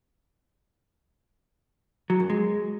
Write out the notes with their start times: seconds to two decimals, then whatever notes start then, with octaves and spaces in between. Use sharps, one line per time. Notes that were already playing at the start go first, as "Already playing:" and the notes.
2.10 F#3
2.20 F#2
2.30 G#3